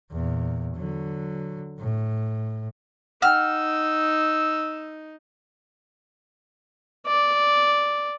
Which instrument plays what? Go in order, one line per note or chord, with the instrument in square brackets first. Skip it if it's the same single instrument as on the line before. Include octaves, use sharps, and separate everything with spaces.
[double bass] E2 A#2
D3 F#3
A2
[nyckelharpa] D#4 [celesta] F#5 G5 [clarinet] E6 [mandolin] F6
[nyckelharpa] D5